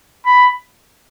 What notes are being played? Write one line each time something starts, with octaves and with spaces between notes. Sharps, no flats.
B5